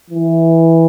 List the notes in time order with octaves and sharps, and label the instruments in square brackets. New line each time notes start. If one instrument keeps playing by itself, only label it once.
[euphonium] E3